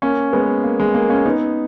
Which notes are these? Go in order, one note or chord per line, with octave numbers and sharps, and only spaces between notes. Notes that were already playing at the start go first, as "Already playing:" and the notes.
A#3 C#4
G#3 B3
A#3
G#3
A#3
A#3 C#4
B3 D#4